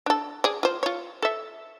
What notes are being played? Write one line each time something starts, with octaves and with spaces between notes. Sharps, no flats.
D4 A4
G#4 D5
F4 C5
F4 C#5
A4 E5